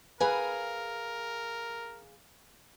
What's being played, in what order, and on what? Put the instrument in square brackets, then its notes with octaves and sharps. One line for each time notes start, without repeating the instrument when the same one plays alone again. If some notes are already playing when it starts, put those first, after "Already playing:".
[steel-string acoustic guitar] G#4 F5 [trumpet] A#4 [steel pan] B4 [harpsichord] G#5